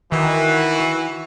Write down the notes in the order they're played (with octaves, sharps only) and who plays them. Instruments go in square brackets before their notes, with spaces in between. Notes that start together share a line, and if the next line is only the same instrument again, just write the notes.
[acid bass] D#3 [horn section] E3 F#4